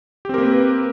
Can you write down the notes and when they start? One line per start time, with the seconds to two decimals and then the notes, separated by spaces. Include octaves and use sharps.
0.25 G4
0.29 C4
0.34 A#4
0.38 A#3
0.43 B4